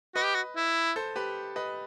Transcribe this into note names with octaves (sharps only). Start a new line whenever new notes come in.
F#4 B4 D#5
G4
F#4
E4
A4 C5
G4 B4
B4 D#5